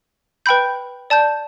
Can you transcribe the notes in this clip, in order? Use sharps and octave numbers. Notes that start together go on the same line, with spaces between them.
B4 G5 B5 G6
D5 A5 G6